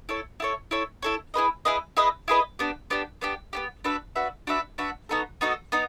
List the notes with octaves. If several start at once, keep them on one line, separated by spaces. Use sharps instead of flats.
E4 A4 C#5
E4 A4 C#5
E4 A4 C#5
E4 A4 C#5
E4 G#4 B4 D#5
E4 G#4 B4 D#5
E4 G#4 B4 D#5
E4 G#4 B4 D#5
B3 D4 G4
B3 D4 G4
B3 D4 G4
B3 D4 G4
D4 F#4 B4 E5
D4 F#4 B4 E5
D4 F#4 B4 E5
D4 F#4 B4 E5
B3 D#4 F#4 A4
B3 D#4 F#4 A4
B3 D#4